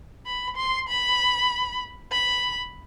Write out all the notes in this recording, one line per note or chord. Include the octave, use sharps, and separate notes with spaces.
B5
C6
B5
B5